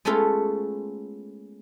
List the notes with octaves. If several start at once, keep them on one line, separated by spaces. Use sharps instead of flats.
G#3 A3 B3 C#4 F4 A4